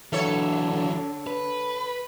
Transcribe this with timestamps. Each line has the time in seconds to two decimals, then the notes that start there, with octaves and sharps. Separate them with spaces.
0.12 D3 E3 F#3 A4 C#5
1.27 B4